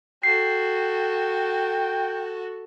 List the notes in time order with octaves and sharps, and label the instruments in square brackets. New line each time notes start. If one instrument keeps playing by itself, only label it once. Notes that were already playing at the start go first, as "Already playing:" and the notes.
[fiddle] F#4 A4 [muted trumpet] G5 [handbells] C7